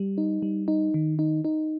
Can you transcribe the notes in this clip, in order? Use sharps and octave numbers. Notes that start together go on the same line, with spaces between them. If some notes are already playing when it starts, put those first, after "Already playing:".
Already playing: G3
D#4
G3
D#4
D#3
D#4
D#4